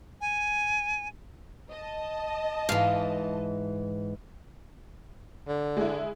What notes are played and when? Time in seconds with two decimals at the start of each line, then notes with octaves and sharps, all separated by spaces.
0.21 G#5
1.71 D#5 A5
2.69 G#2 E3 F5
5.47 D3
5.77 G#3 E4